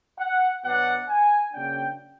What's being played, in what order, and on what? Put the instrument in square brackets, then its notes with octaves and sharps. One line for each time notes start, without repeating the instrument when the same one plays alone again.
[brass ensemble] F#5
B2 F#3 B3 D4 F#5
G#5
C#3 F#3 A#3 D4 G5